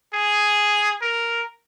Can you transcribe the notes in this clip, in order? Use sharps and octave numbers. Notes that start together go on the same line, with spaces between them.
G#4
A#4